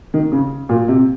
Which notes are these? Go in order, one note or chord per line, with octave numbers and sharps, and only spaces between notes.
D#3
C#3
A#2
C3